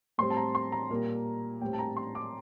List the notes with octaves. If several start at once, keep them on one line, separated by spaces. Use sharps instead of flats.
A2 G3 C4 C6
A5
A#5
C6
A#5
A#2 G3 A#3
A2 G3 C4 G5
A5
A#5
C6
D6